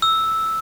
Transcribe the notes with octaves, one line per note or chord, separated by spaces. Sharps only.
E6